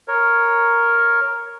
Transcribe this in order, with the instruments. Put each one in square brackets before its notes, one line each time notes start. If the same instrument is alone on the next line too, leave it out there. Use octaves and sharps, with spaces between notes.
[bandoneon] A#4 C#5